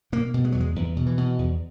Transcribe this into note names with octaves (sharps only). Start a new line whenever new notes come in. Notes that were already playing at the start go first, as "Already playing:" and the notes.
B2 A#3
B2
G#3
E2 F#3
G#3
E2
B2
E3
B2
E2